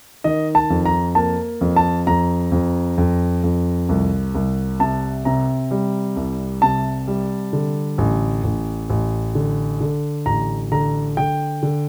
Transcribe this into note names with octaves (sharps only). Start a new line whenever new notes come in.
D#3 D#5
A5
F2
A#5
A#3 A5
F2
A5
F2 A#5
F2
F2
F2
C2
C2
C3 A5
C3 A#5
G3
C2
C3 A5
G3
D3
A1
A1
A1
D3
D3
A1 A#5
D3 A#5
D3 G5
D3